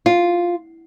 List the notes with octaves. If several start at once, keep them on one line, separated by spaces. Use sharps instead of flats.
F4